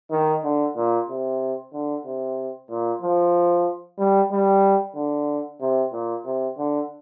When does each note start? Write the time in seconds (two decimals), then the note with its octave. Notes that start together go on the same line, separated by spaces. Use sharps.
0.11 D#3
0.44 D3
0.76 A#2
1.09 C3
1.73 D3
2.05 C3
2.70 A#2
3.01 F3
3.99 G3
4.31 G3
4.95 D3
5.61 C3
5.92 A#2
6.25 C3
6.57 D3